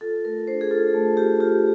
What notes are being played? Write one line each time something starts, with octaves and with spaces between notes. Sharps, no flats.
F4 A4
A3 A#4
D4 C5
G#4
F4 A4
A3
F4 G4
F4 G4